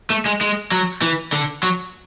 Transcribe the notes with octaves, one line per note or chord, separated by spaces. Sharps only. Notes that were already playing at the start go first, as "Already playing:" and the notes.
A3
G#3
G#3
F#3
E3
D3
F#3